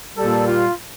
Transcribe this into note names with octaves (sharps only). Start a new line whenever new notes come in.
A#2 G3 A4
F4